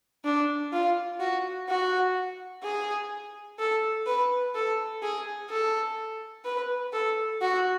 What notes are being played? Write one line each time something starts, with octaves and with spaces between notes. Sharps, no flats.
D4
F4
F#4
F#4
G#4
A4
B4
A4
G#4
A4
B4
A4
F#4